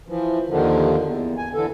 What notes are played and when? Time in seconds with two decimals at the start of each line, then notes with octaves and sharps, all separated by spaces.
0.08 E3 F3
0.49 D#2 D3 D#3 F3
1.02 E2
1.37 G#5
1.54 D3 E3 A4